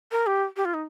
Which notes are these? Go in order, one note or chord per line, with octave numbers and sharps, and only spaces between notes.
A#4
G4
G4
F4
D#4